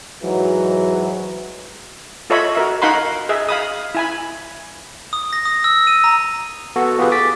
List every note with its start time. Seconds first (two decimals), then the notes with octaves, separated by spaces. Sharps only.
0.22 G#2 E3 F#3
2.30 F4 A4 C#5 D#5 E5 B5
2.55 F#4 A#4 E5
2.82 D#4 A#4 F5 F#5 B5 C6
3.29 G#4 D#5 E5
3.49 F5 B5 D#6
3.95 E4 G#5 B5
5.13 D#6
5.33 A#6
5.45 D#6
5.64 E6
5.87 D#7
6.04 A#5
6.76 B3 F#4 A4
6.98 B3 F4 G4 G#4 B4
7.12 D6 A6 B6